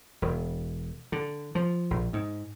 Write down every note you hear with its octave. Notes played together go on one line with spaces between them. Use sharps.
E1
D3
F3
A#1
G#2